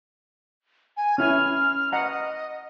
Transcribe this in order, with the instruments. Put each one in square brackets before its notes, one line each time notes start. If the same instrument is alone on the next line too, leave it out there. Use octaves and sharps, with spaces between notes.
[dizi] G#5
[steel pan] C#4 E4 G#5 [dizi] F6
[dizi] D#5 [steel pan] F#5 A#5